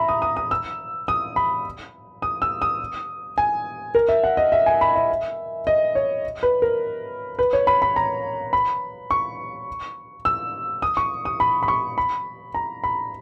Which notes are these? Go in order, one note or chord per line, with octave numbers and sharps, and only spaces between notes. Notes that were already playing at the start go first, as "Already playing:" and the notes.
Already playing: E5 A#5 B5
D#6
D#6
D#6
E6
D#6
B5
D#6
E6
D#6
G#5
A#4
E5
F#5
D#5
E5
G#5
B5
E5
D#5
C#5
B4
A#4
B4
C#5
B5
B5
A#5
B5
C#6
E6
D#6
C#6
D#6
B5
B5
C#6
B5
A#5
B5